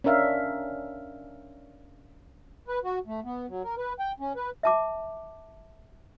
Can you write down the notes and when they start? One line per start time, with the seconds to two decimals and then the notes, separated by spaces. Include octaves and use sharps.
0.04 C#4 D4 A#4 E5 F5
2.68 B4
2.84 F#4
3.07 A3
3.24 B3
3.49 F#3
3.64 A#4
3.78 B4
4.00 G5
4.20 C#4
4.36 B4
4.63 E5 A5 D6